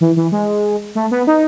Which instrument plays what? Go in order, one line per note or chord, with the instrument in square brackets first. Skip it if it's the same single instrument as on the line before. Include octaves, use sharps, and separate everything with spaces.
[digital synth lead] E3
E3
G#3
A3
B3
D#4